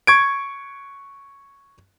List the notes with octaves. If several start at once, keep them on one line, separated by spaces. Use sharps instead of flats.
C#6 G#6 D7